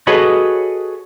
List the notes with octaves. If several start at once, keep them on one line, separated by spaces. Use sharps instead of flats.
F#4 G#4 A4 B4 C#5 D#5